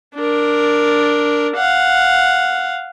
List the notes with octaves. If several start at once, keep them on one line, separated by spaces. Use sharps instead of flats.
D4 A#4
F5 F#5